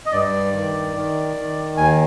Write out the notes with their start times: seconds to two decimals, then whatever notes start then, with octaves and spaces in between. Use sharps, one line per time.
0.06 D#5
0.12 G2 D5
0.53 D#3
0.95 D#3
1.36 D#3
1.77 D#2 G#5